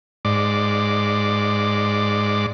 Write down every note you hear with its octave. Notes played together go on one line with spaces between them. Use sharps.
G#2 D5